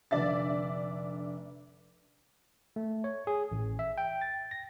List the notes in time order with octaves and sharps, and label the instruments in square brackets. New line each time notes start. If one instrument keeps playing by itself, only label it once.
[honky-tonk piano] F1 D3 D5 E5 A6
[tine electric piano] A3
C#5
G#4
A1
E5
G5
A6
A#6